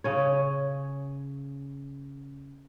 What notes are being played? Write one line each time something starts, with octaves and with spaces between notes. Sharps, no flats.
C#3 C#4 C#5